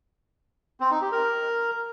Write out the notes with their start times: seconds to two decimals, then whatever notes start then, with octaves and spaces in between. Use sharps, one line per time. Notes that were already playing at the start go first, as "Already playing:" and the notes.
0.80 C4
0.91 D#4
1.01 G4
1.12 A#4